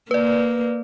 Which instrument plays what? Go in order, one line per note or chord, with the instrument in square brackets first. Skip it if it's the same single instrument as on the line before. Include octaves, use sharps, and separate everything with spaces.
[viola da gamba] A#3 [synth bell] B4 D5